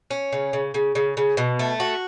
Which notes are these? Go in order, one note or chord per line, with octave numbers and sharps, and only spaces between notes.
C#4
C#3
C#3
C#3
C#3
C#3
B2
A3
F#4